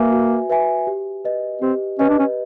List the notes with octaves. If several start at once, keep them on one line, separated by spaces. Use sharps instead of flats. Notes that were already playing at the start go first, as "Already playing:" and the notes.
Already playing: A#3 F#4 B4 E5 G#5
F#4
B4 E5 G#5
G4
B4 D#5
C4 G4
C#4 B4 D#5
D4
C#4